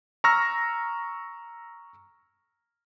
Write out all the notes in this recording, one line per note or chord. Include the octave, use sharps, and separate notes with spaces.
A#5 C#6 E6 F6 A#6